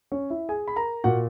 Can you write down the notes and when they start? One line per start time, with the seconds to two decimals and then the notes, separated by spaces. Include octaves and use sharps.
0.12 C#4 C#5
0.30 E4 E5
0.49 G#4 G#5
0.68 B5
0.76 A#4 A#5
1.04 A#2 A#3 F#4 F#5